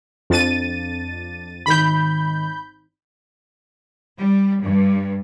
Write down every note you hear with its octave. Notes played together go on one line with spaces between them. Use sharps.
F2 D4 A6 D#7
G#1 D#3 B5 G6
G3
G2